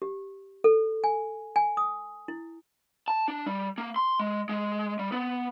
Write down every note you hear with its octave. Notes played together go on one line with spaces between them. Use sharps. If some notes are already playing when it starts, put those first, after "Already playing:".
G4
A4
G#5
G#5
D#6
E4
A5
D4
G3
A#3
C6
G#3
G#3
G3
B3